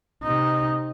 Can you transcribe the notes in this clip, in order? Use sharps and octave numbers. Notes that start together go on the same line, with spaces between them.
C3 D#4